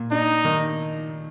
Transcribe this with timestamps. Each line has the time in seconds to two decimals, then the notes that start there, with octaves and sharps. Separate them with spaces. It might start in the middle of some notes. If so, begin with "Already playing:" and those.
Already playing: A#2
0.11 D4 D#4
0.45 D#3